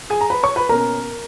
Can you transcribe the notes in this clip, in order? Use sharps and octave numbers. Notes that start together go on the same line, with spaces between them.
G#4 G#5
A#5
B4 B5
C#5 C#6
B4 B5
B2 A#3 C#4 A#4 A#5